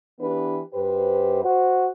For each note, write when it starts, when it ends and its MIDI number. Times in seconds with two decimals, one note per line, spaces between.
0.20 0.60 52
0.20 0.60 59
0.20 0.60 62
0.20 0.60 67
0.20 0.60 71
0.74 1.42 42
0.74 1.42 67
0.74 1.42 71
0.74 1.42 72
1.44 1.86 66
1.44 1.86 72